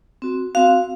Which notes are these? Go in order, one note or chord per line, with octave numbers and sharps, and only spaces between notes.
C4 F#4
C4 F#4 F5